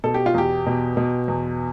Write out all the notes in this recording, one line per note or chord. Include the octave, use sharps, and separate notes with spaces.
B2 A4
G4
F4
E2 G4
B2
B2
E2